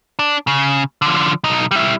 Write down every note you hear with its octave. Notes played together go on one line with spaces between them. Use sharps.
D4
C#3
D3 F3
B1 D#4
G3 E4